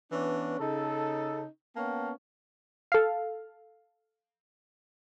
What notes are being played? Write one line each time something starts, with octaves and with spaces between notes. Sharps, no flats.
E3 B3 C#4 D4
C#3 D#4 A4
A#3 B3 C#4 F5 G5 A5
A4 F5